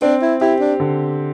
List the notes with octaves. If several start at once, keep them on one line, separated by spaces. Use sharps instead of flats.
C4 D4
E4
E4 G4
D4
D3